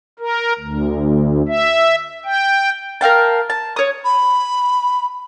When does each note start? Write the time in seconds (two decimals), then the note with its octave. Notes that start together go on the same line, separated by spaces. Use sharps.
0.19 A#4
0.60 D2
1.48 E5
2.25 G5
3.01 A#4 F5 G5 A5
3.50 A5
3.76 C#5 D#6
4.04 B5